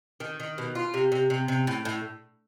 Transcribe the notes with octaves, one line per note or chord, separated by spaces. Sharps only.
D#3
D#3
B2
F4
C3
C3
C3
C3
A2
A2